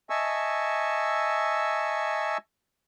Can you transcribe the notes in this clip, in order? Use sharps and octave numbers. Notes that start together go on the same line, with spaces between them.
D#5 E5 G#5 A5 C#6 E6